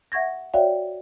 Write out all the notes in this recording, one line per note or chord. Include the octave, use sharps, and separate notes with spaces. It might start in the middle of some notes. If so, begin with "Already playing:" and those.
E5 F#5 C#6 G#6 A#6
F#4 C#5 D5 E5 F5 G5